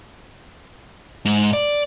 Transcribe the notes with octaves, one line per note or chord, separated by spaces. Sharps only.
G#2
D5